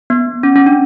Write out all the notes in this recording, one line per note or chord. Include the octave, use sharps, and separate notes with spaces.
B3
C#4
C#4
D4